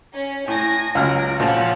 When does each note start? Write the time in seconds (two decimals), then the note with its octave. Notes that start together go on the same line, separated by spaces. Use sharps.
0.14 C#4
0.48 A2 G#5 A#6
0.95 C#2 F#3 F6 A#6 D7
1.39 A#1 F3 C#4 F5 F#5 A5